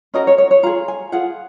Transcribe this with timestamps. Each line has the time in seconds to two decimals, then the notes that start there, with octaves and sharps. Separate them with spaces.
0.14 C#4 F#4 A#4 D#5
0.27 C#5
0.38 C#5
0.51 C#5
0.63 F4 G#4 A#5
0.88 G#5
1.12 F4 G#4 F#5